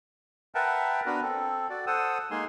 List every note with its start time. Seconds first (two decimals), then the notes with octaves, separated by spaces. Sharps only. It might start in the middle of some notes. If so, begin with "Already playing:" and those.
0.55 A#4 B4 E5 F#5 G5 A5
1.06 B3 D4 F#4 A#4 B4
1.22 C4 A4
1.70 F#4 D5
1.87 A4 C5 F#5 D#6 E6
2.31 G#3 A#3 D#4 G#4 C6